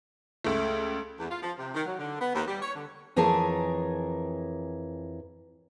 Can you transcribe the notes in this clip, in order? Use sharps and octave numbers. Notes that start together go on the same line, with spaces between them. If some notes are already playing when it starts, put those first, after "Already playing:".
C#2 A3
E2
F4
F3
C3
D#3
F#3
D3
B3
D#2
G3
C#5
D3
F2 E3 G#4 A#4 C#5 A5